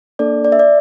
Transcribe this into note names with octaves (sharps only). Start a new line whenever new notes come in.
A#3 D4 A4 D5
D5
E5
D5